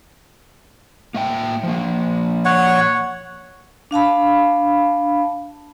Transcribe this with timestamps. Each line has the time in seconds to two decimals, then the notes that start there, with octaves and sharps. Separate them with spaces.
1.14 A#3 E5 G5
1.63 F3 A#3
2.45 C#5 F#5
3.91 D4 F5 A5 B5